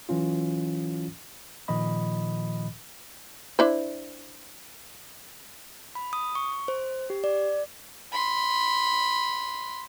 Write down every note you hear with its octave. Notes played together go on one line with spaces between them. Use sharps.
E3 F#3 C#4 F4
A#2 D#3 F3 D#5 B5
D4 E4 C5
B5
D#6
C#6
C5
G4
D5
B5 C6